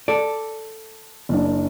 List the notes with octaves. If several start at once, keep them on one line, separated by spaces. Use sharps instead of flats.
A4 D5
F#1 F#2 D4